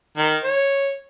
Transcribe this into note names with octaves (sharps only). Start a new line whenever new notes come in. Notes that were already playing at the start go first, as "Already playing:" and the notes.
D#3
C#5